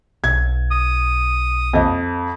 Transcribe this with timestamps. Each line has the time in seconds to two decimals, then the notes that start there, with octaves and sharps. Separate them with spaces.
0.24 B1 G#6
0.72 D#6
1.73 F2 D#5